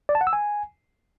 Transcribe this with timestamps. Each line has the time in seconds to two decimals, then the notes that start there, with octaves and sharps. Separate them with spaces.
0.09 D5
0.15 A5
0.21 F#5
0.27 E6
0.33 G#5